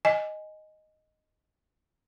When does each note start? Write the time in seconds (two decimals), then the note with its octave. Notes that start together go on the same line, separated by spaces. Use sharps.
0.05 D#5 G#5